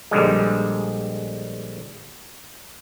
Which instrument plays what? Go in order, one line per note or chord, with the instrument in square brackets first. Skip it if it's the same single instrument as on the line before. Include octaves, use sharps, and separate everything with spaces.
[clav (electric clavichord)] A#1 D3 G3 G#3